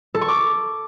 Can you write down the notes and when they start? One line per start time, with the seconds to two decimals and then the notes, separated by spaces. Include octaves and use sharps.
0.14 A4
0.21 C#6
0.28 D6